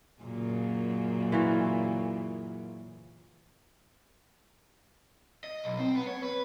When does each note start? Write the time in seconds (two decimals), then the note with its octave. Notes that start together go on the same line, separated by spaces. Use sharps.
0.22 F#2 A#2 C#3
1.32 E3 F4 F#4
5.44 D#5
5.64 B1
5.79 C4
5.95 B3
6.07 C#5
6.23 B4